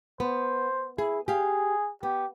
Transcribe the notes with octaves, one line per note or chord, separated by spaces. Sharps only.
B3 C5
E4 G#4
G4 G#4 F5
B3 G4